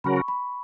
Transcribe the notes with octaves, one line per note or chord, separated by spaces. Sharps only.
C#3 F#3 C#4 F#4 A#4 B5
C#6
B5